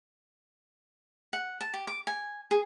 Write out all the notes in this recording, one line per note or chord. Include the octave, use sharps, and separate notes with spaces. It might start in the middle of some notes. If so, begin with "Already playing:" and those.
F#5
A5
G4
D6
G#5
G#4